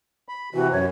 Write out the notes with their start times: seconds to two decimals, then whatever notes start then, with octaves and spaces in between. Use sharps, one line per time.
0.29 B5
0.54 C3 E3 F#4
0.72 F#2 C#5